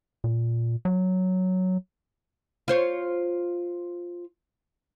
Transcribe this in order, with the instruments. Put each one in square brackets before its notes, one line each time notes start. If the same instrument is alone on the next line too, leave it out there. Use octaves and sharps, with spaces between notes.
[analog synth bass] A#2
F#3
[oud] F4 C5 C#5